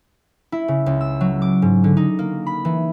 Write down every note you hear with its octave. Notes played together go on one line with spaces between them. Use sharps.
E4
C#3
C#2
E6
F#3
D6
G#2
D3
D#4
A#3
B5
E3